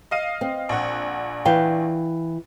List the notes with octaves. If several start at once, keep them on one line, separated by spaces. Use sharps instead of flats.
D#5 F5 D#7
C4
A#1 F#5
E3 F5 G5